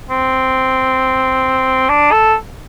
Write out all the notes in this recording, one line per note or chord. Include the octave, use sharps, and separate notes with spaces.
C4
D4
A4